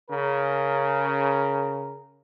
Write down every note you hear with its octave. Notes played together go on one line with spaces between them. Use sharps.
C#3 A#4